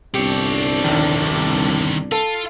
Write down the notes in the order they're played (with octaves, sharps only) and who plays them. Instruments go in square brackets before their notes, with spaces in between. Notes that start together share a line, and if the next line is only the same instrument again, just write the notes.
[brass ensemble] G1 C2 D4 [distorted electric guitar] C4 C#5 [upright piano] G4
[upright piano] A#1 D#2 [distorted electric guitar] D3 D#3
[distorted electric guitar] F4 [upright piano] A4